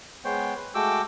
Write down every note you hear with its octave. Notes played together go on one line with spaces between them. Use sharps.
G#3 B3 C5 C#5 G5
B4
G#3 A3 F#4 G5 D6 E6